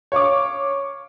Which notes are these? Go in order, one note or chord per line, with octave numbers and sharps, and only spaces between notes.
C#5 F5 C#6 D6